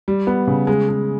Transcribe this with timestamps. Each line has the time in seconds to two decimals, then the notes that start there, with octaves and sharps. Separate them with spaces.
0.08 G3
0.27 B3
0.47 C#3
0.67 G#3
0.89 G#3